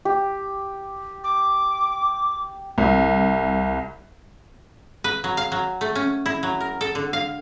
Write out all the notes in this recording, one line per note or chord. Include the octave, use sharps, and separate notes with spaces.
G4
D6
C2
B4
F#3
F5
F#3
A3
C#4
E4
F#3
A#4
A4
D3
F5